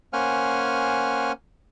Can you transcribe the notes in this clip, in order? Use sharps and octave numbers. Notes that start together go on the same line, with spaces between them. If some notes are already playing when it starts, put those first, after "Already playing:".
A#3 C#4 C5 F#5 G#5 F6